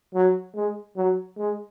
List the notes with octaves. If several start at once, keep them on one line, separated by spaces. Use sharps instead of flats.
F#3
G#3
F#3
G#3